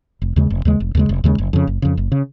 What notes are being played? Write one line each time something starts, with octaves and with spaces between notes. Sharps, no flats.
F1
D#2 C#3 G#3
F1
D#2 C#3 G#3
F1
D#2 C#3 G#3
F1
D#2 C#3 G#3
F#1
F2 C#3
F#1
F2 C#3
F#1
C#3